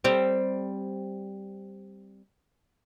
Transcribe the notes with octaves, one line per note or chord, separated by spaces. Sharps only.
G3 C4